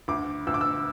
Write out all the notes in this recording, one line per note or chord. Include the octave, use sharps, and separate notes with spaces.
D2 D6
D2 E6
D6
E6